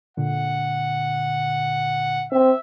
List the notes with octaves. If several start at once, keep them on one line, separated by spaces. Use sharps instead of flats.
A#2 D3 F#5
C4 E5